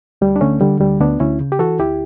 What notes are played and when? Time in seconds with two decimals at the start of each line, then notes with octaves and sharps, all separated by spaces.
0.21 D2 G3
0.36 D4
0.41 D3 A3 C#4
0.61 D3 G3
0.80 D2 G3
1.01 D2 B3 D4
1.20 D2 C#4 E4
1.40 C#3
1.52 G4
1.59 E3 F#4 A4
1.80 D2 E4 G4